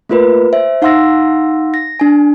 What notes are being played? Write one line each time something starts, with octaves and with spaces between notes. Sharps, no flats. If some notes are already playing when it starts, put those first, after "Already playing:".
A3 A#3 F4 A#4 B4
C5 E5
D#4 F5 F#5 C6 E6 A#6
A#6
D4 G#5